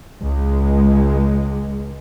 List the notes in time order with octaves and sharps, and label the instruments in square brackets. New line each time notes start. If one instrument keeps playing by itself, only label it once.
[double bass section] C#2 G#3